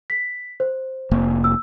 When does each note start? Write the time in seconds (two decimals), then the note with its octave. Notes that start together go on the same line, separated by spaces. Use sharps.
0.10 B6
0.60 C5
1.11 F1 A#3
1.44 E6